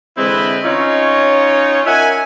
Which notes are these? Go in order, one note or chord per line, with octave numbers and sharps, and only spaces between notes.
D3 E3 G#3 C4 E4 B4
C#4 D#4 F4 C#5
A#4 E5 F#5 G#5